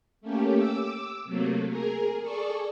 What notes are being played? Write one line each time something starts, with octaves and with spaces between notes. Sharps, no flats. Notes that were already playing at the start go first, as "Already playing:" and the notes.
A3 A#3 C#4 G4
D6 E6
C3 F#3 A3 A#3
G#4 A#4
G#4 A4 D5 C#6